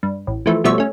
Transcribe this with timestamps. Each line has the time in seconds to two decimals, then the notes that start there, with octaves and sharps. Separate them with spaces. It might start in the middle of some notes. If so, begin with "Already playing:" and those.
0.03 G2
0.27 A1
0.46 E3 F3 A3
0.64 B2 F3 G3 A3 C#5 E5
0.78 A3 C#4